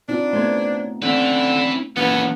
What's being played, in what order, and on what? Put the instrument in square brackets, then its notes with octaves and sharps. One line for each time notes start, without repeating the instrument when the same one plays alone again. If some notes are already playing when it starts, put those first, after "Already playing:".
[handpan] C4 D#4 F4 [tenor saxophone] D4
[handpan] A3 B3 [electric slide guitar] C5 C#5
[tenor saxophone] D3 [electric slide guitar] C4 C#4 [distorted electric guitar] E4 B4
[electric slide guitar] E3 A#3 C#4 [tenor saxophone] B3 [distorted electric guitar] A4 C#5